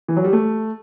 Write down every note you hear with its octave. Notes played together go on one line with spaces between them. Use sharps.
E3
F#3
G3
A3